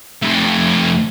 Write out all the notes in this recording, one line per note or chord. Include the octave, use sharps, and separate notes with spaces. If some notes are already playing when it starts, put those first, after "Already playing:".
F2 A3